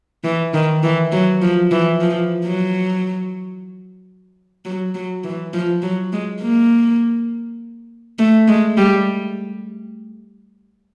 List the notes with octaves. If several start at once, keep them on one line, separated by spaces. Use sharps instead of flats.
E3
D#3
E3
F#3
F3
E3
F3
F#3
F#3
F#3
E3
F3
F#3
G#3
A#3
A3
G#3
G3